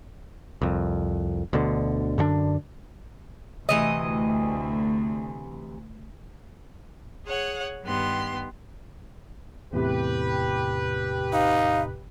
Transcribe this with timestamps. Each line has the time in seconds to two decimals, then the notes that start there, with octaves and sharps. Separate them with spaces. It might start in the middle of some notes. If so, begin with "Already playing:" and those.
0.62 C2 F2
1.53 D2 B2 D3
2.18 F#2 D3 C#4 D4
3.69 D2 C3 E3 D#5
7.25 G#4 C#5 F#5
7.83 G2 D#3 B3 G4 C6
9.73 E2 A2 C3 G4 B4
11.33 D#4 F5